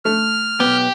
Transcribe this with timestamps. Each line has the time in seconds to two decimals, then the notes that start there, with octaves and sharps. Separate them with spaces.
0.05 A3 F6
0.60 B1 B3 G4